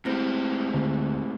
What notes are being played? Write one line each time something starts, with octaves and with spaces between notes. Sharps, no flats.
A2 G#3 C4 E4 G4 C5
D2